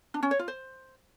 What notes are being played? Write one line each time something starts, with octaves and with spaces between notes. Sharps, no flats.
D4
C#4
C#5
F4
C5